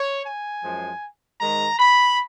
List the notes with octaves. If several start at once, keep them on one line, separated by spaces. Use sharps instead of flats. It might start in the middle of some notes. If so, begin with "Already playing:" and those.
Already playing: C#5
G#5
F#2 F3 G#3
G#2 D#3 G#3 A#5
B5